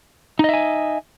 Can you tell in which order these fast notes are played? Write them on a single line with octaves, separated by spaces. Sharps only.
D#4 D#5 E5 G#5